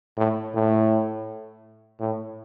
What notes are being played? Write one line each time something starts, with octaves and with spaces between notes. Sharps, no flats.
A2
A2
A2